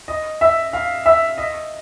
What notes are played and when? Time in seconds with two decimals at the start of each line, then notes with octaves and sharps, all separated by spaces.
0.08 D#5
0.41 E5
0.73 F5
1.06 E5
1.38 D#5